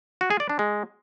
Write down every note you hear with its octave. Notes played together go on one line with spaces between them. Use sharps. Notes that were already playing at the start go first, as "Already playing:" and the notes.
F#4
G#4
D5
D4
G#3